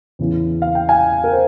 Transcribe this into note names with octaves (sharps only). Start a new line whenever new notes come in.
E2 C#3 E3
F5
G5
F5 G#5
A#4
C5